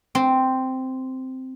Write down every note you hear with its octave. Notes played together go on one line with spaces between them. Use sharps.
C4